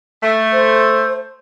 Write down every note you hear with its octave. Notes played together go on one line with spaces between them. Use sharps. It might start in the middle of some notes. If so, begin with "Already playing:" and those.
A3
C5